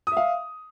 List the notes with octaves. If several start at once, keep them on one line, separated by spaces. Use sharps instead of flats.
E5 F5 D#6